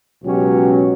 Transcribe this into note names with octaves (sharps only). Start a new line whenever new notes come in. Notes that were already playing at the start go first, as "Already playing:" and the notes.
C#2 B2 F#3 C#4 G4